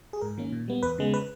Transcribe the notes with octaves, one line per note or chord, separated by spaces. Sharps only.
G#4
G#2 A#4
D#3 A#3 C#4
A#2
G3 B3
E2 B4
C#3 G#3 B3
B4